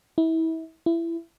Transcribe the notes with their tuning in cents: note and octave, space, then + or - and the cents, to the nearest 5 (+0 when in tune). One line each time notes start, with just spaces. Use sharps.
E4 -30
E4 +20